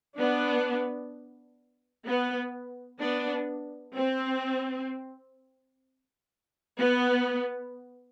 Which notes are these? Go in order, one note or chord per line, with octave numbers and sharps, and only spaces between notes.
B3 D4
B3
B3 D4
C4
B3